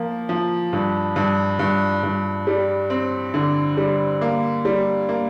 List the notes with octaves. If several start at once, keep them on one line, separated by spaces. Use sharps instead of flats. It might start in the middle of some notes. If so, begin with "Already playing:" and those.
Already playing: F3 A#3
F3
G2
G2
G2
G2
G3
C4
D3
G3
A#3
G3
A#3